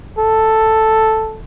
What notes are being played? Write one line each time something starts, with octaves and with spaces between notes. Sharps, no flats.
A4